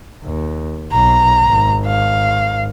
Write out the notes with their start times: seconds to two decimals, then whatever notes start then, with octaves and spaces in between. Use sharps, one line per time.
0.24 D#2
0.92 B1 A#5
1.44 G#1
1.86 F5